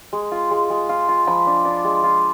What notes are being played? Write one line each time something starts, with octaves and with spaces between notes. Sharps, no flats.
G#3
F4
G#3
G#3
F4
F4
F3 B5
D4
D4
G#3
F4